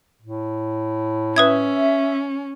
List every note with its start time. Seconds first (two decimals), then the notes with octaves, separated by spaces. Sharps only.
0.22 A2
1.36 C#4 B4 E5 D#6 G#6